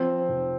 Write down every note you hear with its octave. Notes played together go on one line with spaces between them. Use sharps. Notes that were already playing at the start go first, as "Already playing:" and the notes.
Already playing: F3 C4
F1